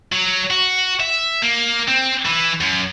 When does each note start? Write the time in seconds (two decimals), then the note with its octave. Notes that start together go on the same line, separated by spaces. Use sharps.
0.12 F#3
0.50 F#4
1.00 E5
1.42 A#3
1.88 C4
2.26 E3
2.61 F#2